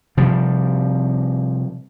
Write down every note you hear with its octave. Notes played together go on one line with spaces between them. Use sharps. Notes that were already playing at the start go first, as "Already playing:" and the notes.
C3 F3 G3